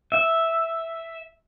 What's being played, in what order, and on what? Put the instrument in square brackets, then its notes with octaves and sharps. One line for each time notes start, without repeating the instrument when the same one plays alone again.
[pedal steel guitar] E5